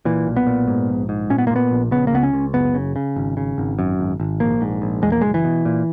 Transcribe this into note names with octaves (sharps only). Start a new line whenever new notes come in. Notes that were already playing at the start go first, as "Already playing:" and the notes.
A#2 E3
B1
B3
A#2
G#2
A#1
G#2
A#2 C#4
B3
A#3
A#2
B3
A#1
C#3 B3
A#3
C#2 B3
C#4
C#2
F#1 B3
C#3
C#3
G#1
C#3
G#1
F#2
G#1
G#1
A#1 A#3
G#2
A#1
E2 G#3
A#3
F#1 G#3
E3
B2
A#2